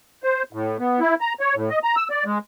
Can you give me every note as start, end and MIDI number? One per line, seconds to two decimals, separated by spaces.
0.23 0.43 72
0.53 0.77 45
0.79 1.00 59
1.00 1.15 64
1.21 1.33 82
1.40 1.55 73
1.55 1.69 45
1.70 1.79 75
1.83 1.95 82
1.96 2.08 88
2.10 2.24 74
2.25 2.38 56